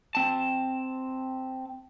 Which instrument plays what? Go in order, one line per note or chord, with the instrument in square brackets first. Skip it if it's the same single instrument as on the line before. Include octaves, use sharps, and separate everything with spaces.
[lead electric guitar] C4 A5